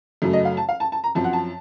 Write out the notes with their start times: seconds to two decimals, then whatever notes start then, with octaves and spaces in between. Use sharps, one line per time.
0.22 F#2 C#3 F#3 A3
0.33 D#5
0.45 F5
0.57 A5
0.69 F5
0.80 A5
0.92 A5
1.04 A#5
1.15 F#2 F3 C4 A5
1.24 F#5
1.33 A5